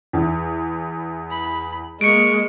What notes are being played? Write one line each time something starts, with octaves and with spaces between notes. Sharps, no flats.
E2 E4
B5
G#3 A#3 C#6 C#7 D7